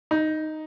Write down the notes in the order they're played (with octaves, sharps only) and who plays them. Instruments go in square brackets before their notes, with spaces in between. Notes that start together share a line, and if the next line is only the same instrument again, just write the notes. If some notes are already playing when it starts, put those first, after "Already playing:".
[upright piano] D#4